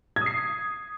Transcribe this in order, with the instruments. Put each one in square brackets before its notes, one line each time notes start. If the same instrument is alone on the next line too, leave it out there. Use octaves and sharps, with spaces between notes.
[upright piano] G#6
D#6
C7